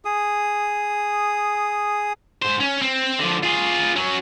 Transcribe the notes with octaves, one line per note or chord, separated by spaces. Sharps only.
G#4 D#6
G#2 C5
C#4
C4
D3 F3
F4 G#4
F#3 C#4